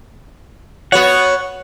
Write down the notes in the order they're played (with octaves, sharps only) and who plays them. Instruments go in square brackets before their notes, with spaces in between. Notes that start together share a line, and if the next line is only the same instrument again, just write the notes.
[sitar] B3 F#4 C#5 [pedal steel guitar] F#5